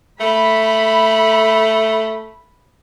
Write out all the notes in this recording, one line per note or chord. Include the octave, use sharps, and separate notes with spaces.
A3 B5